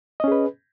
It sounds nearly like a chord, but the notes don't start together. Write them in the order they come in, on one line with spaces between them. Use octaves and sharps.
D#5 C#4 G#4 B4